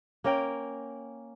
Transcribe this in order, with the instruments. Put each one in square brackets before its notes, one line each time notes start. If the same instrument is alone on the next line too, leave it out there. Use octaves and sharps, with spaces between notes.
[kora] A#3 C#4 A#4 G5